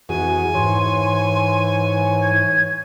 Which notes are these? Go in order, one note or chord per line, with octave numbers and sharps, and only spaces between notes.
F2 E3 F#4 G#4 G#5
G#2 E3 C#5 C6
G#6